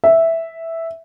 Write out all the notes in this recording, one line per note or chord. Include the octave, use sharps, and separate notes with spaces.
E5